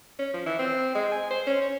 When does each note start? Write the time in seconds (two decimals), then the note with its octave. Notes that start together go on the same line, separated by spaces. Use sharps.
0.19 C#4
0.33 F3
0.46 E3
0.59 C4
0.95 G#3
1.12 G#5
1.30 C5
1.47 C#4
1.62 C#5